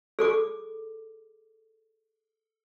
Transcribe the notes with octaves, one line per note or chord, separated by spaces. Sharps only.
G#4 A4 D6